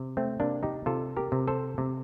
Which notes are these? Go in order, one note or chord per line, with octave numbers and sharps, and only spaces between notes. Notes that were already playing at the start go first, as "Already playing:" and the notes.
Already playing: C3
A3 C4
C3 A#3 D4
D#4 G4
C3 F4 A4
G4 A#4
C3
A4 C5
C3